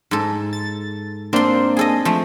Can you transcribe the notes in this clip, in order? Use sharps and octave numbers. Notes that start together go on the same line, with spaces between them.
G#2 A4
A6
A#3 C4 D4 C5 C6
G#4 A4 D#5
F3 A3